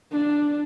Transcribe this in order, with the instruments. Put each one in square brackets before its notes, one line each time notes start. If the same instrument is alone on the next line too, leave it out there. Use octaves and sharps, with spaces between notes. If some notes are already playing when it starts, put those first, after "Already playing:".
[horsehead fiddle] D4